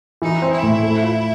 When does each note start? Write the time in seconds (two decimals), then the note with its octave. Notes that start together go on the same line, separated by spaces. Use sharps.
0.22 E3 D#4
0.42 C4
0.53 E4
0.63 A2
0.82 A3
1.03 F4